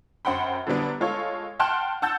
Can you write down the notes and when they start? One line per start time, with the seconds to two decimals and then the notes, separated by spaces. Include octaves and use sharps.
0.25 F#2 C5 F#5 G5 B5
0.67 D3 F#3 G3 B3 D4
1.01 G#3 F4 A4 C#5
1.59 F#5 G5 A5 C6 F6 F#6
2.02 F#5 A5 E6 G6 A6